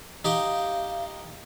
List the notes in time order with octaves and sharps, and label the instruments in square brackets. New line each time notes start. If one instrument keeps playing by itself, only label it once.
[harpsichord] D#4 G4 G5 [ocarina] F5